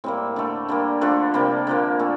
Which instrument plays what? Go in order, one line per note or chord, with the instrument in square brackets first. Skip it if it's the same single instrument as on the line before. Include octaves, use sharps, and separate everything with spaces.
[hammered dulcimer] A2 G3 A#3 C4
D3 A3
D3 G3 A#3
D3 F3 A3 D4
C3 G3 A#3
D3 F3 A#3
A#2 A3